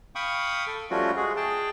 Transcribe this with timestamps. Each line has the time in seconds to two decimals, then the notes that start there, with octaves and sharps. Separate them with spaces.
0.15 F5 G5 B5 C#6 D#6
0.67 A4
0.90 F3 G3 A3 C#4 F4 F#4
1.17 G#3 F#4 G#4
1.37 G#4 G5 A5